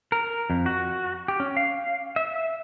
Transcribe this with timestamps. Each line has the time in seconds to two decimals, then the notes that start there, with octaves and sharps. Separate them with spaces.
0.12 A#4
0.50 F2
0.66 F#4
1.28 G4
1.40 C#4
1.57 F5
2.16 E5